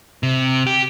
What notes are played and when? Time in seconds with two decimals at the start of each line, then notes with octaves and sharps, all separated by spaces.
0.23 C3
0.67 G4